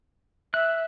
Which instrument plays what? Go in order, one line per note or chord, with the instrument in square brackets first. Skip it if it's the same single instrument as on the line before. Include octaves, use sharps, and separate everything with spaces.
[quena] E5 [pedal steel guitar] F#6